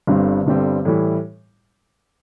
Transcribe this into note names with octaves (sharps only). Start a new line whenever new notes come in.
G1 G2 D3 G3 C4
G1 G2 D3 G3 C4
A2 E3 G3 E4